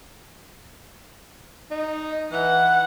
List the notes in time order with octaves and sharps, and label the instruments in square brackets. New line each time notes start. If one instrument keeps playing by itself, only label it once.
[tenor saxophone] D#4
[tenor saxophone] E3 [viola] F#5